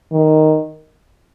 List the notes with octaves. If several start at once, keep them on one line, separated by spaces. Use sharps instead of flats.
D#3